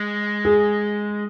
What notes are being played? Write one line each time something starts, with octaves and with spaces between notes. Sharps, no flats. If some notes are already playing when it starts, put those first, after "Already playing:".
Already playing: G#3
G#4